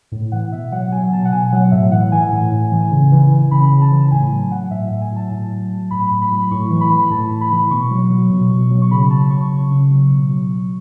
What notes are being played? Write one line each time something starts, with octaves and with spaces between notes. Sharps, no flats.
A2
E3 F#5
B2 E5
F#3 F#5
F#3 G#5
B2 A5
F#5
B2 G#5
F#3 F#5
A2 E5
E3 F#5
E3 G#5
A2
A2
E3
C#3
E3
E3
C#3 B5
C#3
A5
E3
A2 G#5
F#3 G#5
F#3 F#5
A2 E5
A2 E5
G#5
F#3 A5
A2
F#3
F#3
A2 B5
A2
B5
F#3
A2 C#6
E3
B5
E3
A2 A5
A2
B5
E3
B2 C#6
F#3
F#3
B2
B2
F#3
C#6
C#3 B5
F#3 A5
F#3 C#6
C#3
C#3
F#3
B2
F#3
F#3